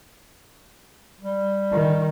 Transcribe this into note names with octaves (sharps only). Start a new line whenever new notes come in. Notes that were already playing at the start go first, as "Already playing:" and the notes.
G3
D#3